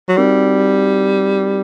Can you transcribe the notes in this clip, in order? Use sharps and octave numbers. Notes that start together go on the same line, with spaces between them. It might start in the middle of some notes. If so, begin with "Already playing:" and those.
F#3
G3 C4 D#4 F#4 A#4